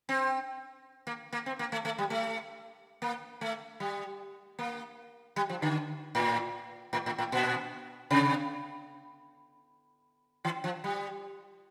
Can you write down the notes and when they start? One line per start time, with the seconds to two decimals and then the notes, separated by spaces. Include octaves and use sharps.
0.09 C4
1.07 A#3
1.33 A#3
1.46 C4
1.59 A#3
1.72 A3
1.85 A3
1.98 G3
2.10 A3
3.02 A#3
3.41 A3
3.80 G3
4.59 A#3
5.36 G3
5.50 F3
5.62 D3
6.15 A2
6.93 A2
7.06 A2
7.18 A2
7.32 A#2
8.11 C3
10.45 E3
10.64 F3
10.84 G3